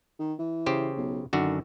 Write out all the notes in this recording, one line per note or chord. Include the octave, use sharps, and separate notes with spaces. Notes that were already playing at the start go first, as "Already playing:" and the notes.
D#3
E3
C#3 G4 C5
B1
F#2 D3 D#3 F#4